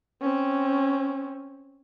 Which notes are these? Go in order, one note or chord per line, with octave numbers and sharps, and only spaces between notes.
C4 C#4